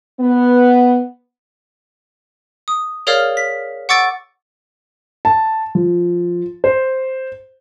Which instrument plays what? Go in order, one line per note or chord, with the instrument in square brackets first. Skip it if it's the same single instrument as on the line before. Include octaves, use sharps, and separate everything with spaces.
[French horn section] B3
[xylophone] D#6
G#4 A#4 C#5 D5 F5 F6
B6
F#5 C#6 D6 E6 A6 D7
[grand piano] A5
F3
C5